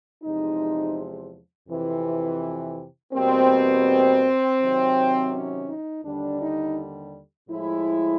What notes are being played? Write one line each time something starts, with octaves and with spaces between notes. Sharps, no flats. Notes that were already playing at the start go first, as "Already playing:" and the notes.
E2 C3 F3 G#3 D#4
F2 C3 E3
E2 B2 G3 A#3 C4
C3 D#3 F#3
C#4
D#4
D#2 D3 G3 D4
D#4
A2 F3 G#3 E4